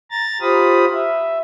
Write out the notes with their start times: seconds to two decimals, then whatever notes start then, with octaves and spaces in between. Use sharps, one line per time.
0.11 A#5 A6
0.41 F4 G4 C5 F5 B5 D#6
0.93 E5